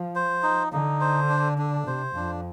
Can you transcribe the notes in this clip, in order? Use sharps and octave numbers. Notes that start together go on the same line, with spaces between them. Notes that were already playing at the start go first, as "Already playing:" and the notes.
Already playing: F3
C5
D#4
D3 D#4
C5
D4
D4
C3 C5
F2 D4